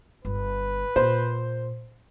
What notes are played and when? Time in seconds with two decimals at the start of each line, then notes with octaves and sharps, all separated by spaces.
0.25 G1 B4
0.96 A#2 C5